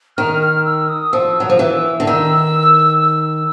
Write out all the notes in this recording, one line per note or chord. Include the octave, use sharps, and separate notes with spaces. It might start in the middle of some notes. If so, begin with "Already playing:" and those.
D#3 F6
F6
E6
D#6
F3 E6
F#3
F3
E3
D3
D#3 E6
E6